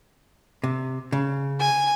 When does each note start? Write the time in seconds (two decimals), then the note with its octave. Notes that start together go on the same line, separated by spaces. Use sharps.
0.64 C3
1.12 C#3
1.60 G#5